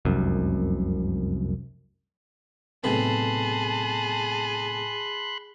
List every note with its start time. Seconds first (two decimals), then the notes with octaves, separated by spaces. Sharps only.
0.05 F1 C2 F#2
2.84 B1 A2 C3 G#4 A5 B5 C6 F#6